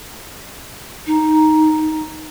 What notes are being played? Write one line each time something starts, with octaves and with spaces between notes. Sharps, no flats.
D#4